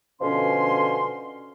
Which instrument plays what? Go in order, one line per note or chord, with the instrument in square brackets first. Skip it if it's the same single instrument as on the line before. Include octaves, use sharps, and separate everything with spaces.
[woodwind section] B2 D3 F3 C#4 C6